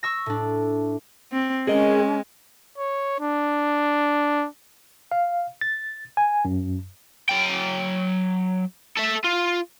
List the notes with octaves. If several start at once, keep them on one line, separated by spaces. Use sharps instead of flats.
C#6 E6 A#6
A2 D4
C4
G#3 C#4 G#4 A#4 D#5
C#5
D4
F5
A6
G#5
F#2
F#3 G5
A4 E5
F4